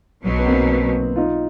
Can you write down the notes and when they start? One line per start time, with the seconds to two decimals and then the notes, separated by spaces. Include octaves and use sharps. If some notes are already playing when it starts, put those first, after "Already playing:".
0.23 B1 B2 F#3
0.39 B3
0.46 A#3 C4
1.16 D#4 F4